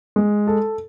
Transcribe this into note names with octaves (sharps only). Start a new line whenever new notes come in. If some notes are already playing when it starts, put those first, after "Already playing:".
G#3
A4